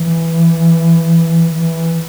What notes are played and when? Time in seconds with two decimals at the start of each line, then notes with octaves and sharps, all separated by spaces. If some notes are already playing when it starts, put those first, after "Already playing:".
Already playing: E3
1.52 E3